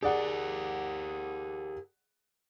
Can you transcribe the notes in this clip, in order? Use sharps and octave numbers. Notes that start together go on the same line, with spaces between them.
G4 G#4 A#4 D5 F#5